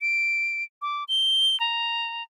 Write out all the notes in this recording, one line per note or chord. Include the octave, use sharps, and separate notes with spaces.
D7
D6
G7
A#5